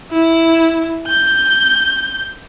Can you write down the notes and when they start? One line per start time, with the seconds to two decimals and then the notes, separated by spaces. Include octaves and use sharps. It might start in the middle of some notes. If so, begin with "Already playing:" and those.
0.12 E4
1.08 G6